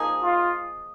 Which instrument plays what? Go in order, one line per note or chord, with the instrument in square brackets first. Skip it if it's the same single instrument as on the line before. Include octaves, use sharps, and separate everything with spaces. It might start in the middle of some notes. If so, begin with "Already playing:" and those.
Already playing: [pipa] F3 A#3 D#4 G#4
[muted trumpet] F4